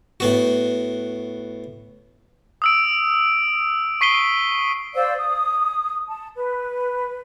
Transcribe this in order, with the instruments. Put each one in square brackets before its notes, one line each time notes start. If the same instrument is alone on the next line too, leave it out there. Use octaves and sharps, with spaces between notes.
[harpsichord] A2 B3 F#4
[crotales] D#6 E6 D7
C#6 B6 C7 D#7 G7
[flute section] C5 D5 F5 E6
D#6
A5
B4